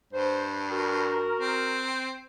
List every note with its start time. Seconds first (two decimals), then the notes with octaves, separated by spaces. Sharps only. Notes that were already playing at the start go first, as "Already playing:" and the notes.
0.13 G2 C5
0.71 F#4 A#4
1.40 C4